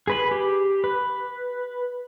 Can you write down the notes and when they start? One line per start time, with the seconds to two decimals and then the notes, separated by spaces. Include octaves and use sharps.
0.07 G#4 B4 B5
0.31 G4
0.84 B4